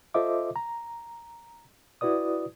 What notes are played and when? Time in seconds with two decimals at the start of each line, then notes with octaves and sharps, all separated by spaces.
0.14 F4 A4 C5 D#5 E5 D6
0.56 A#5
2.01 E4 F#4 B4 D5 D#6